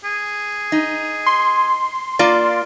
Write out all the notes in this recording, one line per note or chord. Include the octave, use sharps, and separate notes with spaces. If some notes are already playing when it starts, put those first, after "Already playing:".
G#4
D#4
C6
A#3 F4 D5